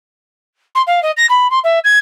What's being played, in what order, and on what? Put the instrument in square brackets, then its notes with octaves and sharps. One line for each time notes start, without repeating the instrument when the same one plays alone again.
[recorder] C6
F5
D#5
A#6
B5
C6
E5
G#6